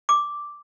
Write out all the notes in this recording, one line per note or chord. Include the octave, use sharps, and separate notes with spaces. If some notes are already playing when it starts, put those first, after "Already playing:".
D6